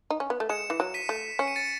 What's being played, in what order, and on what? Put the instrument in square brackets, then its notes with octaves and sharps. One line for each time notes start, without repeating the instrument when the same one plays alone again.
[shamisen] D#4
C#4
B3
A3
[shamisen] G#3 [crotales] C#7 E7
[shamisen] E3
F#3
[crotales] B6 D#7
[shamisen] A3
[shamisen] C#4 [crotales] C#7
[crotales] D#7
A6 C#7